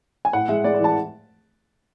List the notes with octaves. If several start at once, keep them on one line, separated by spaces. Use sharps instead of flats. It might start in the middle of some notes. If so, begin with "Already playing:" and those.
G#5
A2 F#5
G#3 E5
G#3 D5
D5
E3 A5